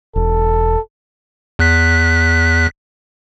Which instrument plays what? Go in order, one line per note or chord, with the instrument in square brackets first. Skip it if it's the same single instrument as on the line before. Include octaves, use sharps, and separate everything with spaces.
[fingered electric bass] E1 [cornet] A4
[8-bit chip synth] E2 F#6 B6